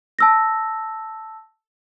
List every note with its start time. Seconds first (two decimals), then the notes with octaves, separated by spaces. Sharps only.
0.19 A5 E6 A#6